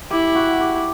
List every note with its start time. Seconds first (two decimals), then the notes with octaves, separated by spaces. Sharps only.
0.10 E4 G4
0.35 F#4
0.60 G4